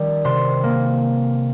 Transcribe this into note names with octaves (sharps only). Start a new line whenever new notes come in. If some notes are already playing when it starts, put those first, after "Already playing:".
Already playing: D#3 G3
C3 C6
A#3